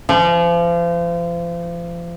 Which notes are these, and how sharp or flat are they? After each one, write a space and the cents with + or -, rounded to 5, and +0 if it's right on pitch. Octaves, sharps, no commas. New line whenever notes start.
F3 -35